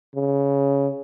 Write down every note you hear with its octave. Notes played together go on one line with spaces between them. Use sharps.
C#3